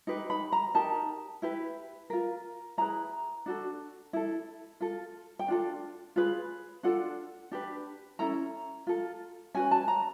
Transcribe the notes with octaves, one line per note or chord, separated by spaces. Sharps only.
D#4 G4 B4
B5
A#5
D#4 G4 A#4 A5
E4 G4 B4
F4 A#4
E4 G#4 B4 A#5
D4 F#4 A4
E4 A4
F4 A4
G5
D4 F4 A4
F4 G#4 B4
D4 F4 A4 F#5
D4 G4 B4
C#4 E4 A4 A#5
F4 A4
C#4 F#4 B4 G#5
A5
A#5